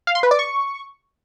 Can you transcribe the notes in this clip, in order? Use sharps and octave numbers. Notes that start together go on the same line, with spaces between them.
F5
C6
B4
D5
C#6